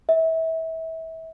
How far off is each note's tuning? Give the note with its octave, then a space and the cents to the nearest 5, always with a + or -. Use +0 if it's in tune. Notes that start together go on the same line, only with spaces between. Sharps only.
E5 -30